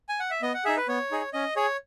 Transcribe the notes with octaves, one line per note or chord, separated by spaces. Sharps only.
G#5
F#5
E5
B3 D#5
F#5
D#4 G#4 E5
B4
B3 C#5
D#4 G#4
C#4 D#5
G#4 C#5